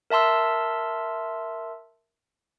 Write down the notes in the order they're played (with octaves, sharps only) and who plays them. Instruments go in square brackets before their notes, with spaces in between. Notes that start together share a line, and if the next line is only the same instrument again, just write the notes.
[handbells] A#4 E5 A5 C6 E6